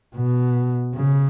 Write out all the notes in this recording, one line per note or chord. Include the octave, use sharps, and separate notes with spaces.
B2
C#3